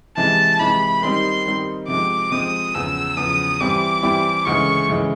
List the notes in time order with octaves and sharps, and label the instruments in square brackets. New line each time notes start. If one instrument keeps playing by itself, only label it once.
[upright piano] C3 E3 G#3 [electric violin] A5
[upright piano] C3 E3 G#3 [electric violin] B5
[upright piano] D#3 G3 C4 D#4 [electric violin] C6
[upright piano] D#3 G3 C4 D#4
[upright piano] C3 F3 G#3 C4 [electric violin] D6
[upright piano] C3 F3 G#3 C4 [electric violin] D#6
[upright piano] E2 C#3 F3 [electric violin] E6
[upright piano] E2 C#3 F3 [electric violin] D#6
[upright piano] E3 G3 C4 E4 G4 [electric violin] D6
[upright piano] E3 G3 C4 E4 G4
[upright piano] D2 C#3 E3 G#3 [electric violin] C#6
[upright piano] D2 C#3 E3 G#3